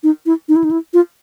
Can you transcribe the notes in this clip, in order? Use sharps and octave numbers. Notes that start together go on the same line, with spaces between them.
D#4
E4
D#4
E4
D#4
E4
F4